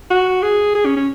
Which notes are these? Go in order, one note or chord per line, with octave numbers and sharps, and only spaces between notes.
F#4
G#4
G#4
C#4
C#4